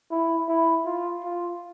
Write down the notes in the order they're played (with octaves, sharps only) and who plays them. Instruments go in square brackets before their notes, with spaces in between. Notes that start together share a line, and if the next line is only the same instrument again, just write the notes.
[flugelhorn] E4
E4
F4
F4